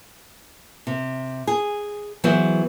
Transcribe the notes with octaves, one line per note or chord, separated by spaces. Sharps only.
C3
G#4
E3 F#3 B3 G#4 C5